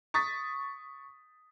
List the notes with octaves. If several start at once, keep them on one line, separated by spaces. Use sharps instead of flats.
C#6 D#6 A6 B6